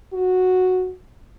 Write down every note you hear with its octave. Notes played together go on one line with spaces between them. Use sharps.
F#4